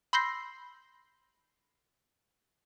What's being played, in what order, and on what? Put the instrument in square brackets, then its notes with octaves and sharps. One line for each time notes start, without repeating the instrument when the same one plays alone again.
[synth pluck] B5 C6 E6 G6 A#6 C7